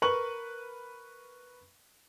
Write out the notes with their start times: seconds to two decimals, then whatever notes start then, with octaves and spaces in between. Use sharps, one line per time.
0.02 A#4 B4 C#6 F#7